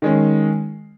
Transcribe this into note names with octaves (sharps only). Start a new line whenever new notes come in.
D#3 G#3 C#4